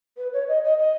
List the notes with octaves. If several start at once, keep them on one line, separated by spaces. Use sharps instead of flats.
B4
C#5
D#5
D#5
D#5